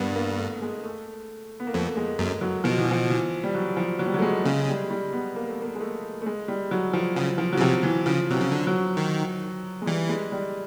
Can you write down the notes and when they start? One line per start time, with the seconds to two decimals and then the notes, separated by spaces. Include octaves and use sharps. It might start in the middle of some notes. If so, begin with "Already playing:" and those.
Already playing: G2 A#3 B3
0.16 A#3
0.31 A#3
0.39 A3
0.62 G#3
0.84 A3
1.60 B3
1.67 A#3
1.74 F2 A3
1.97 G#3
2.19 F#2 G#3
2.41 F#3
2.64 B2 F3
2.78 E3
2.91 F3
3.10 E3
3.44 G3
3.55 F#3
3.77 F3
3.99 F#3
4.07 G3
4.14 F#3
4.19 A3
4.22 G#3
4.44 C#3 G#3
4.68 G3
4.91 G3
5.13 B3
5.36 A#3
5.49 A3
5.62 A#3
5.75 G#3
5.81 A3
6.22 A3
6.26 G#3
6.48 G3
6.71 F#3
6.93 F3
7.16 C#3 F3
7.38 F3
7.53 F#3
7.57 C#3
7.61 C3 F3
7.83 E3
8.06 C#3 F3
8.30 C3 F#3
8.37 C#3 F3
8.52 D3
8.67 F#3
8.97 D#3
9.82 G#3
9.86 E3 G3
10.09 G#3
10.32 G3